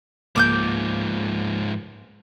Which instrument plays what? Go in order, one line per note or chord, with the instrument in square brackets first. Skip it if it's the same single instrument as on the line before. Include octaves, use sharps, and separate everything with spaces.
[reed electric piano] C#2 A#3 [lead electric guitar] G#2 F3 [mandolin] D6 D#6 G6